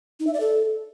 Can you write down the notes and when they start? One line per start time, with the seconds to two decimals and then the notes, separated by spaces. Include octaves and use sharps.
0.20 D#4
0.27 E5
0.34 D5
0.40 A4